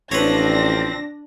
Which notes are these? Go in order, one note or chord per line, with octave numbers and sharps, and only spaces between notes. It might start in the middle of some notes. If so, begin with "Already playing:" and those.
A1 F3 C4 D4 B4 C#5 A#6